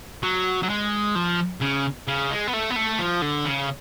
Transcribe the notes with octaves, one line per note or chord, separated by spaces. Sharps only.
F#3
F#3
G#3
F3
C#3
C#3
G#3
B3
A3
B3
A3
F3
D3
C#3